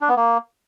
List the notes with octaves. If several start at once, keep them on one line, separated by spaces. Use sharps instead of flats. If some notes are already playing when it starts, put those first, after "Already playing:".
D4
B3
A#3